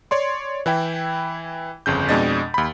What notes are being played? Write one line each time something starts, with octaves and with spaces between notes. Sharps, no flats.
C#5 D5 C6
E3 E4 G5
G1 F2 C#3 G6
F2 B2 G#3 D4 D#5 A6
D#2 B5